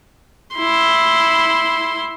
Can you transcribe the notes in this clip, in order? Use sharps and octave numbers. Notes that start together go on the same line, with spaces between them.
E4 C6